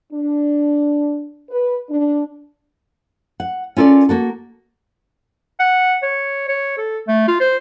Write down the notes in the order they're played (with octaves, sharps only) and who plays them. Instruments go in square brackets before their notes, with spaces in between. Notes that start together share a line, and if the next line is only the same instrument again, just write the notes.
[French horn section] D4
B4
D4
[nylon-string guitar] F#5
C#4 F4 A4 A#4 D5
A#3 F#4 A4
[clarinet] F#5
C#5
C#5
A4
A3
F4
C5